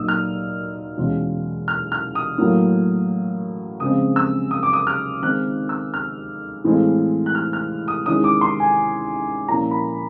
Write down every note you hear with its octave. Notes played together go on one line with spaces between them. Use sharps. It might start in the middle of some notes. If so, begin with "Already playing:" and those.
Already playing: A#2 F#3 A#3 D#4 D#6 E6
F6
E2 B2 G#3 C#4 F4
F6
F6
D#6
A2 F#3 A#3
C#3 F3 G#3 C4 D#6
E6
D#6
D6
D#6
F6
D#3 G#3 C4 D#4 F#6
E6
F6
A2 E3 G#3 C4 F4
F#6
F6
F6
D#6
D#3 G#3 C#4 E4 D#6
D6
C6
G#5
A#2 F3 A#3 C#4 E4 A#5
B5